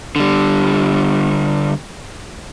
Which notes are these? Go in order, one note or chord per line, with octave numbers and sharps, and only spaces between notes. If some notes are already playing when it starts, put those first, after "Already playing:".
D3 G3